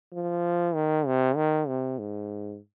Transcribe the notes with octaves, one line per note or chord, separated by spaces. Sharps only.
F3
D#3
C3
D#3
C3
G#2